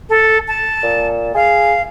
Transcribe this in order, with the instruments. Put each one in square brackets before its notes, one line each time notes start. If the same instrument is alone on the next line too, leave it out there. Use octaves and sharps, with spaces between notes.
[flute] A4
A5
[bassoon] A#2
[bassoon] G#4 [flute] F5